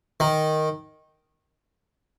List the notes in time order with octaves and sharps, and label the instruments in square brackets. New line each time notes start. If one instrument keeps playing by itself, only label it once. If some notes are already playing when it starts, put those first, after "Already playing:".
[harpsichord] D#3